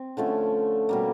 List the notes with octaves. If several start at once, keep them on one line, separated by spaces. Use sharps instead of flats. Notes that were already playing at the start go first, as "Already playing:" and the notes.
Already playing: C4
D3 F3 A3 C#4
B2 G3 A#3